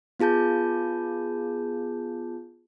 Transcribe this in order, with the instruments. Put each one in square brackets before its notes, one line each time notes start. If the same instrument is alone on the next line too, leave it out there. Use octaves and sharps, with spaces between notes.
[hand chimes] B3 F4 G#4 A5 G6